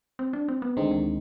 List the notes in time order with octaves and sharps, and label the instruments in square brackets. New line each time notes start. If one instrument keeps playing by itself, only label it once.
[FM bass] C4
D4
C4
B3
[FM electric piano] D2 D3 G#3 C4 D#4 [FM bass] D#3
[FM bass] D#3